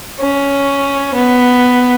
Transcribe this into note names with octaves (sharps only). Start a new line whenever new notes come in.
C#4
B3